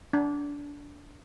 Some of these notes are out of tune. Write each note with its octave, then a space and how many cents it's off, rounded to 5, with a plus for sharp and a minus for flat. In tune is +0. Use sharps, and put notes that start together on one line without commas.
D4 -20